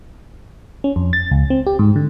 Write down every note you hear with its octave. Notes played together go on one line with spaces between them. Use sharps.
C#4
F2
A6
C#2
C4
G4
G#2
D3